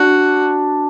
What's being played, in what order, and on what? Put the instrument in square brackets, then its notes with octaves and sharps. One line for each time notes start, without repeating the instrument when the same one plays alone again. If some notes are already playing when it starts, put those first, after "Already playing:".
Already playing: [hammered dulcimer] D4 [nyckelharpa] F#4